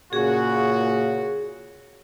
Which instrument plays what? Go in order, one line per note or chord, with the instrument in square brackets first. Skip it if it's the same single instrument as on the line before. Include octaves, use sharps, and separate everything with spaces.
[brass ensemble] A#2 C#3 F#4 [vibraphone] G#4